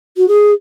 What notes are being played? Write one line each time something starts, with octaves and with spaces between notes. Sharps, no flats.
F#4
G#4